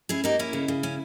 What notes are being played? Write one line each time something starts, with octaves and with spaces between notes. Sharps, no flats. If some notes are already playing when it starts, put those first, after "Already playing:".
C#4 E4 G#4
A#3 D#4 G4
C#4 E4
C#3
C#3
C#4